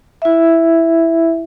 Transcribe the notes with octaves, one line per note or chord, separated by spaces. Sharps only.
E4 E5